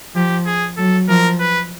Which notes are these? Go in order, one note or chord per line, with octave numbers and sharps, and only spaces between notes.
F3 G4
G#4
F#3 A4
F3 A#4
B4